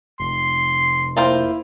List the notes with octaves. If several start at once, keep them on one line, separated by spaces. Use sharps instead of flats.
F1 C6
A#3 E4 F4 C5